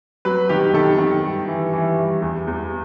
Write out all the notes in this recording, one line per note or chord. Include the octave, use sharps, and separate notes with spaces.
F#3 B4
D#3 G4
D#3 A4
D#3
G2
E3
E3
G2
E2
E2